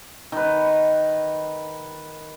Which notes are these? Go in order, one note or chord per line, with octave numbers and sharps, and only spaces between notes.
D#3 B4